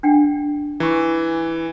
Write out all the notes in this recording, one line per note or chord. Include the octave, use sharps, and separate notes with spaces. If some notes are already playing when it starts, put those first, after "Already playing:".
D4 F#5 G5
E3 A#5 C#6